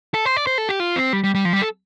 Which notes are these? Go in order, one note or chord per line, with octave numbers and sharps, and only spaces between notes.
A4
C5
D5
C5
A4
G4
F4
C4
G3
G3
G3
F3
G3
A4